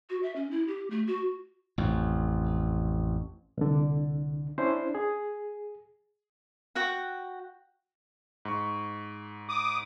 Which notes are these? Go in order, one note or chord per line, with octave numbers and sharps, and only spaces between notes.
F#4
E5
C#4
E4
G4
A3
F#4
A1 F2
C2 D3
C#4 D4 E4 C5
G#4
F#4 F#5 G5
G#2 C#6
D6 D#6